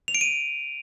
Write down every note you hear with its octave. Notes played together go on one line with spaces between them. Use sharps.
F7
D7
D#7